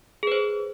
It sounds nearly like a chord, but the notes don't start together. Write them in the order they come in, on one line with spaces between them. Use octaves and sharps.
G#4 B4 C5